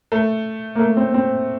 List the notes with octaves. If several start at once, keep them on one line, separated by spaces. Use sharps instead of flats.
A3
A#3
A3
C4
C4